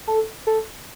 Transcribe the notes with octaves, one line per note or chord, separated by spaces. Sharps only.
A4
A4